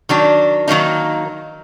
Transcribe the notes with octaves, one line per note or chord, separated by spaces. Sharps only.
D#3 F#3 D4
D#3 F#3 A#3 D#4